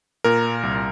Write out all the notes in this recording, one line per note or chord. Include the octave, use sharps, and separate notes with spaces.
A#2 A#4
C2